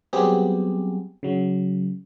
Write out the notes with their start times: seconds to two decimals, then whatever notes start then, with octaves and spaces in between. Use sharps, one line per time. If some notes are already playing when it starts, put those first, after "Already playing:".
0.13 F#3 G3 B3 C4 G4 G#4
1.23 C#3 F#3